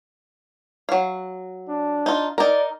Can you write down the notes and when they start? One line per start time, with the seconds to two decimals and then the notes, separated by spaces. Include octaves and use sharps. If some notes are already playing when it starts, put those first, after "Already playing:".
0.89 F#3 F5
1.69 D4
2.06 D#4 F4
2.38 D#4 A#4 D5